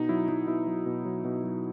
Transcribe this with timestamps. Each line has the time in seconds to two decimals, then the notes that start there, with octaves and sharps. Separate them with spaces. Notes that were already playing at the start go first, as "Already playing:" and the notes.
Already playing: B2 D#4
0.09 F#3 E4
0.28 F#3 D#4
0.47 B2 E4
0.67 F#3
0.86 B2
1.05 F#3
1.25 B2
1.43 F#3